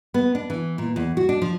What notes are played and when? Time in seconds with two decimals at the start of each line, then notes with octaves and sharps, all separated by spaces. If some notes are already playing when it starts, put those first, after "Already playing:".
0.14 B3
0.35 D4
0.50 E3
0.78 A#2
0.96 E2
1.17 F#4
1.29 D4
1.42 F3